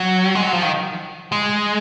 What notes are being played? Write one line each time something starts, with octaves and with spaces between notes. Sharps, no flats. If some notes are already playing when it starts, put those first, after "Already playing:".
Already playing: F#3
G#3
F#3
F3
D#3
G#3